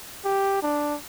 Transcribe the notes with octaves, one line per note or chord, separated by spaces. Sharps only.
G4
D4